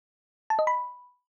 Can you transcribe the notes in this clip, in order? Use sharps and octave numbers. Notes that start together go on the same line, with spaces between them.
A5
D#5
B5